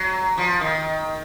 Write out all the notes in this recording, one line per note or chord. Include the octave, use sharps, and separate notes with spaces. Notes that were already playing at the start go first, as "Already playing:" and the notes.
Already playing: F#3
F3
D#3